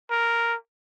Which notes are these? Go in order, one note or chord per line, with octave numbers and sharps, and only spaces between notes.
A#4